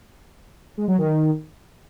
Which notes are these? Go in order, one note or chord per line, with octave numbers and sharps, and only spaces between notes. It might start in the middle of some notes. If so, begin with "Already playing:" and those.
G#3
F#3
D#3